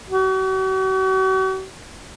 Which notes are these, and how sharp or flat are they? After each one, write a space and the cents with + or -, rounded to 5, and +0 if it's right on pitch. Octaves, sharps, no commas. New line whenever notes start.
F#4 +40